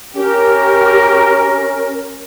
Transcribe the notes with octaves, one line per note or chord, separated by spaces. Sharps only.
C#4 G4 A#4